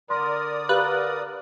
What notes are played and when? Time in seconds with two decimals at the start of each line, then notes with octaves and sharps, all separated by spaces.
0.10 D3 A#4 D5 C6 D#6
0.69 G4 A#4 B4 F5 F#6